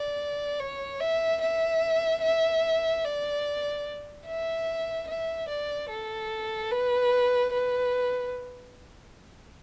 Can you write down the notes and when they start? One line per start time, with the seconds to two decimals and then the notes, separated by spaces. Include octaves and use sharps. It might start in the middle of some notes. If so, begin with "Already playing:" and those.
Already playing: D5
0.60 C#5
1.00 E5
1.41 E5
2.22 E5
3.05 D5
4.27 E5
5.07 E5
5.48 D5
5.90 A4
6.71 B4
7.53 B4